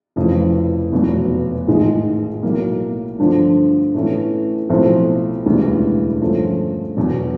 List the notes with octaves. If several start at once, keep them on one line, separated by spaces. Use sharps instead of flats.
F1 F2 C#3 E3
F1 E2 B2 F#3
A1 G#2 D#3 G#3
B1 A2 F#3 A#3
G2 D3 F3 A3 D4
A2 E3 A3 C#4
B1 A2 F3 A3 C4
E1 D2 C#3 E3 G3
G2 D3 F3 A3 C#4
E2 B2 F#3